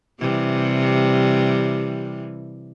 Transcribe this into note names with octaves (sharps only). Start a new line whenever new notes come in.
C3 E3 G3